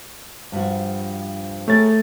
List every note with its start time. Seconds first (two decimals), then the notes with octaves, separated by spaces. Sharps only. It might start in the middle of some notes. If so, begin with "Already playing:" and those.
0.52 G2 F3 F#4
1.68 A3 G#4 A#4 C#5 A6